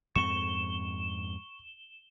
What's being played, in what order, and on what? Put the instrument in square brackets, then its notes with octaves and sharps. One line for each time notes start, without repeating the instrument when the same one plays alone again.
[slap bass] F2 G#2 C4 [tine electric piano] C#6 [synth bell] E7 G7